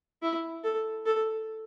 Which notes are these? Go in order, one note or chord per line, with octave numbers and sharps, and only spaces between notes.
E4
A4
A4